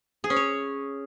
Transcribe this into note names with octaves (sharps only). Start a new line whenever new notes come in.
G#4
C#4
C#5